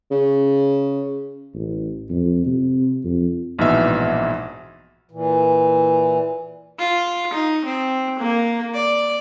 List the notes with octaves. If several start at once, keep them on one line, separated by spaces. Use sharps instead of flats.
C#3
A1
F2
C3
F2
A#1 G#2 B2 E3 E5
A#2 E3
F4
D#4
C4
A#3
D5